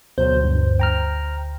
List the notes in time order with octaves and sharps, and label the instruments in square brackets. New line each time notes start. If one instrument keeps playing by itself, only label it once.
[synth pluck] D2 C5 G6 [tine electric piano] B2 F#3
[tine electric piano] G2
G5 A#5 F6